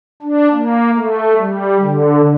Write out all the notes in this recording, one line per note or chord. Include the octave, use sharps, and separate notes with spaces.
D4
A#3
A3
G3
D3